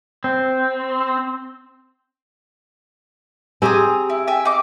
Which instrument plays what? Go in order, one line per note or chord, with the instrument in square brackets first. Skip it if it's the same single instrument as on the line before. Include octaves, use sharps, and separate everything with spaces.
[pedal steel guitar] C4
[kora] C4 G4 G#4 [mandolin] G#5 A#5 D#6
[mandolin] E4
E5 G5 G#5
D#4 D6